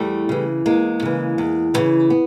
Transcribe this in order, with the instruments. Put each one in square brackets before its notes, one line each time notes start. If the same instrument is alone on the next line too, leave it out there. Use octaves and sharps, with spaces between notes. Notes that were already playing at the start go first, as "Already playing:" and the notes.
Already playing: [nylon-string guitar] E2 G3 A3
C#3 E3
E2 G#3 A#3
C#3 E3
E2
C#3 E3
B3